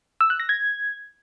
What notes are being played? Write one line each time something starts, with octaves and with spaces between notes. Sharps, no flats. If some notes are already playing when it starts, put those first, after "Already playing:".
E6
F#6
A#6
G#6